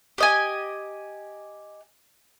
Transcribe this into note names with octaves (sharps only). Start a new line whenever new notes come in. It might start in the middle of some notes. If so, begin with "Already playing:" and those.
G4 D#5 G#5